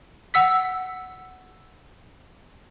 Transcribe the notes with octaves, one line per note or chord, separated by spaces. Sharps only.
F#5 E6 B6